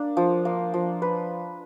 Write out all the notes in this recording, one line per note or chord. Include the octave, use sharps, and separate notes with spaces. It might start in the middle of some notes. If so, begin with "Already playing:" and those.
Already playing: A#3 D4
F3
A#3
F3
B4